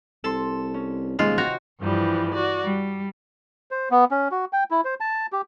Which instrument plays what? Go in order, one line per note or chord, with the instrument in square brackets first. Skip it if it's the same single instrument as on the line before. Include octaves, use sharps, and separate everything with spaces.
[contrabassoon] C2 [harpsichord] A4 [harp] A5 C6
[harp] C#4
[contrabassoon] D#1 [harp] C3 D#3 F3 [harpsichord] G#3 [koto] F4
[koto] F#4 [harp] G5 [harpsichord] A#5
[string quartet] G2 E3 F3 G3
F#4 D5
G3
[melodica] C5
B3
C#4
F#4
G5
E4
C5
A5
G4